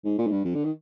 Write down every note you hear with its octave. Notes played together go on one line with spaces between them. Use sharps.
G#2
A#2
G#2
G2
F2
D3
D#3